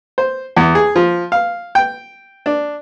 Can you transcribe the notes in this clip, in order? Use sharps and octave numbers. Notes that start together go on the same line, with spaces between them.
C5
E2
G#4
F3
F5
G5
D4